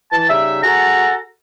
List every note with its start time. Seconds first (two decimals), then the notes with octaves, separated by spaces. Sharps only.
0.12 E3 A5
0.29 C#3 G3 D#4 E5
0.63 F#4 G#4 A4 F#5 A5 A#5